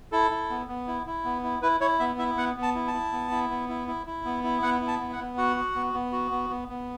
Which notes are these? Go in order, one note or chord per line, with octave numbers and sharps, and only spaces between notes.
E4 A4
E4
B3
B3
E4
E4
B3
E4
E4 B4
E4 C#5
B3 E5
E4 E5
B3 F#5
B3
A5
E4
A5
E4
B3
E4
B3
E4
E4
E4
B3
E4
B3 F#5
E4
A5
B3
F#5
B3
F#4 F#5
F#4
B3
B3
F#4
B3
B3
B3